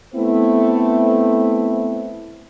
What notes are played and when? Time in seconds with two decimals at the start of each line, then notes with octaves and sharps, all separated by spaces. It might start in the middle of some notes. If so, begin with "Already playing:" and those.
0.13 A3 B3 C4 E4